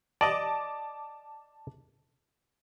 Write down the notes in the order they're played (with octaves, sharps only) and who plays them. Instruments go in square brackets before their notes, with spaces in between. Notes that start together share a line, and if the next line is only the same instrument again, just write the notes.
[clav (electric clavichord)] D5 D#5 [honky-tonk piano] A5 D6